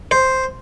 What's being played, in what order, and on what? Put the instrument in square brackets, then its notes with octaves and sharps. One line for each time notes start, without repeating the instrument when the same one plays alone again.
[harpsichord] C5